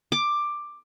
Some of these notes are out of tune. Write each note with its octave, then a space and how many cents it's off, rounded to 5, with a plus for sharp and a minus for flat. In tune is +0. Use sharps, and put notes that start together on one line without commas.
D6 +10